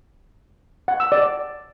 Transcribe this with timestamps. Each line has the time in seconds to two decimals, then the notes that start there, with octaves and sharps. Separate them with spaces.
0.88 F#5
1.00 E6
1.12 D5